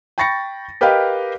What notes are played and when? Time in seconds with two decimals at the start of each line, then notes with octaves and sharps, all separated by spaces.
0.18 G5 B5 C#6 A6 A#6 C#7
0.81 G4 A#4 B4 D#5 F5 G5